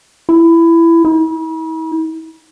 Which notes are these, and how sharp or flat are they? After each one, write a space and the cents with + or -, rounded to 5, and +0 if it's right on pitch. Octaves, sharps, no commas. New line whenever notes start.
E4 +15
E4 -45